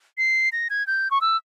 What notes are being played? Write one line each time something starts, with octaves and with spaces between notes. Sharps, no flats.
C7
A#6
G#6
G6
C#6
E6